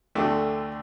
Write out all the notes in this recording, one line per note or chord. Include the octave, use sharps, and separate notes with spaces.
D2 D3 A3 D4 G4